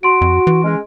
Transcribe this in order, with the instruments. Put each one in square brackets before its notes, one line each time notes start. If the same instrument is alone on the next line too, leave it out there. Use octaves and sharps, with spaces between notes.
[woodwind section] F#4 [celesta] C6 D7
[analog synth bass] F2
E3
[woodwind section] G#3 C#4